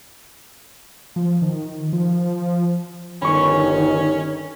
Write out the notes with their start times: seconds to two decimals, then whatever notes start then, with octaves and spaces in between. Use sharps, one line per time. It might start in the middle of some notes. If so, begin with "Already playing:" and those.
1.16 F3
1.42 D#3
1.93 F3
3.22 G1 D#3 C#4 B5 C#6